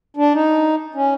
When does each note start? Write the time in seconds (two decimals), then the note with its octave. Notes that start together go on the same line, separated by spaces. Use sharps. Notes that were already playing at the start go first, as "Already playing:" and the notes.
0.17 D4
0.33 D#4
0.95 C#4